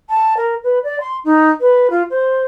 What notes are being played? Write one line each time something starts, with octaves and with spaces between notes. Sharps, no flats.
A5
A#4
B4
D5
C6
D#4
B4
F4
C5